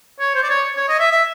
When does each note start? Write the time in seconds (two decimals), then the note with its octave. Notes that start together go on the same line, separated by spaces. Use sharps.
0.20 C#5
0.35 C5
0.43 D5
0.50 C#5
0.77 C#5
0.89 D#5
1.00 E5
1.11 E5